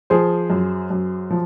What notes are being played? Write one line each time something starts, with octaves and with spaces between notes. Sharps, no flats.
F3 G#4 C5
F#2
F#2
F3